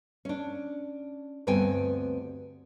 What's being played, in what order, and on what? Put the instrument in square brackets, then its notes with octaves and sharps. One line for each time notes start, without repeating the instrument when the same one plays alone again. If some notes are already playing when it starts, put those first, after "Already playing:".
[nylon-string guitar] C#4 D4
D2 G2 B3 C4 G5 G#5